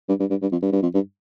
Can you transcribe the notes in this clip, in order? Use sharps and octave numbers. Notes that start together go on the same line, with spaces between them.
G2
G2
G2
G2
F2
G2
G2
F2
G2